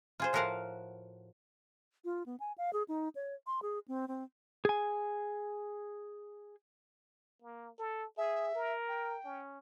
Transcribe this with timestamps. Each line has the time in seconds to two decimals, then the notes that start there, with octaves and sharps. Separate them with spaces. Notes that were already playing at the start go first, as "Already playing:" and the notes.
0.20 F4 G#4 C5
0.33 A2 F3 F#4 A#4 F5 F#5
2.05 F4
2.26 B3
2.40 G#5
2.58 F5
2.73 G#4
2.88 D#4
3.15 C#5
3.47 C6
3.62 G#4
3.88 C4
4.08 C4
4.65 G#4 G#5
7.42 A#3
7.78 A4
8.17 G#4 E5
8.55 A#4
8.88 G5
9.25 C#4